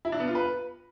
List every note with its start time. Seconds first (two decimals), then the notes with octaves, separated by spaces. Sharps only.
0.05 E4
0.12 D4
0.20 B3
0.27 F4
0.35 B4